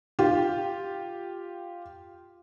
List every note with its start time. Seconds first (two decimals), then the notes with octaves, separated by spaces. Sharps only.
0.19 F4 G4